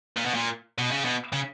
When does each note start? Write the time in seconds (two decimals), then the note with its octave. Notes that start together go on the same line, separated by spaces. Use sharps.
0.17 A#2
0.26 B2
0.34 A#2
0.78 B2
0.91 C#3
1.04 B2
1.33 C#3